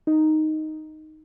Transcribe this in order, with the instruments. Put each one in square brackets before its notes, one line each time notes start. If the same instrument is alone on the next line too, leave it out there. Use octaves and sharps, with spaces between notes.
[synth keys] D#4